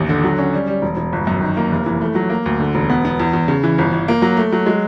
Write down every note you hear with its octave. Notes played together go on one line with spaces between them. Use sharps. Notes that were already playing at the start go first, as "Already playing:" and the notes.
Already playing: A1 D#2
D3
F#3
C#4
G3
G3
E1
E1
G1
F#2
D#3
A#3
F1
E3
A3
F#3
A#3
D2
D3
E1
B3
B3
E2
E2
C#3
E3
G1
G1
A#3
F#3
A3
F#3
G#3